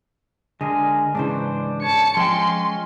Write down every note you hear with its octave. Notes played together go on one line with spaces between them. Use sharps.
D3 G#3 G#4 A#4
G#2 C#3 E3 D4 C5
C#5 A5 C#7
F3 G#3 C#4 F4 G5 C6